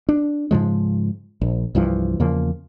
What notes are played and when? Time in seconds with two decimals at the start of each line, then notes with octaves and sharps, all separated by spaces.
0.09 D4
0.51 G#2 C#3 F3 G#3
1.41 A#1
1.75 C2 G2 E3 F3
2.20 E2 C#3 F3 A#3